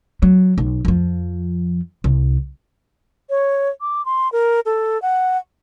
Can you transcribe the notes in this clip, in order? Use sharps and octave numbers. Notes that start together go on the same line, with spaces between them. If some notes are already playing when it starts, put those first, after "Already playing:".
F#3
B1
F2 F3
C2
C#5
D6
C6
A#4
A4
F#5